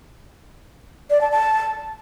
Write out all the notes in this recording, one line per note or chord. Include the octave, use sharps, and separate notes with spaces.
D5
A5
A5